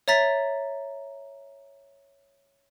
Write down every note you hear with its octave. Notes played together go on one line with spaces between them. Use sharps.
C#5 E5 A#5 A6 B6